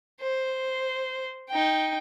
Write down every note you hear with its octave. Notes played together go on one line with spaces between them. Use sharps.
C5
D#4 G5